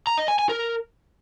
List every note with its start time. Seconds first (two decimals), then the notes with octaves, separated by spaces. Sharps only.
0.07 A#5
0.18 D#5
0.28 G#5
0.39 G#5
0.49 A#4